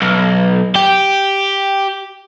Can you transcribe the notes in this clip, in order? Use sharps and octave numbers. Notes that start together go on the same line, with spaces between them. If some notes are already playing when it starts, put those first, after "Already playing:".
B1
G4